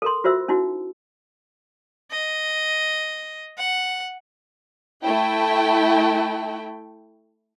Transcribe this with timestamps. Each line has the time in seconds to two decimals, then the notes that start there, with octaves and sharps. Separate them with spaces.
0.02 A4 A#4 C6
0.24 F4 F#4 C5 E5 E6
0.48 C#4 D#4 E4 F#4
2.11 D#5
3.59 F#5
5.04 A3 E4 G5